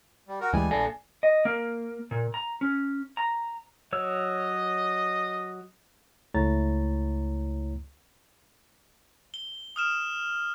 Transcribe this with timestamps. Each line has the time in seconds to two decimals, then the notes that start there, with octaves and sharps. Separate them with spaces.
0.28 G3
0.41 F#4 A#4
0.53 D2 E3 G3 G#3 G#5
0.71 A#1 D4 A4 D5 G#5
1.23 D#5
1.45 A#3
2.11 A#2
2.34 A#5
2.61 C#4
3.17 A#5
3.93 F#3 C#5 D#5 E6
6.34 C#2 A3 E4 C#5 A#5 A6
9.34 G7
9.76 D#6 F6 E7